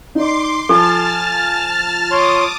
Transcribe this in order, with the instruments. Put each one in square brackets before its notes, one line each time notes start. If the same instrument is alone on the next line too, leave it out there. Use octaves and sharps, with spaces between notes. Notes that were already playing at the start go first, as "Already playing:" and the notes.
[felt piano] D#4 D5 [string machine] C6 D6 C7
[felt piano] F3 [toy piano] A4 [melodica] G#5 [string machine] A5 F6 A6
[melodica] C#5 C6 [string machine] D6 D#6